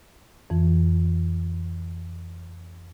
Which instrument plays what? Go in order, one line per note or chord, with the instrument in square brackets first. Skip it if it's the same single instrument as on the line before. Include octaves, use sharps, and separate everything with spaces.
[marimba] F2 E3